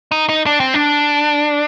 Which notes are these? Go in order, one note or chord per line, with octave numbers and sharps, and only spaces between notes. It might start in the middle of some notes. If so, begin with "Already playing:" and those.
D#4
D#4
D4
C4
D4